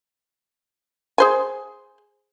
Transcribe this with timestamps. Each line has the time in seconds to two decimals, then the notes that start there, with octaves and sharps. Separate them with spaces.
1.18 G#4 C5 G#5